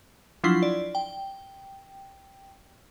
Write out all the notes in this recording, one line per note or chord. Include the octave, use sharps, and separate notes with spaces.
F3 F#3 D4 E4 F4 C6
D5
G5